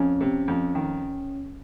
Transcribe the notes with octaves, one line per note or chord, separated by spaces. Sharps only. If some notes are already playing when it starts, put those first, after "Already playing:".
Already playing: F2 C#4
C3
F2
D#3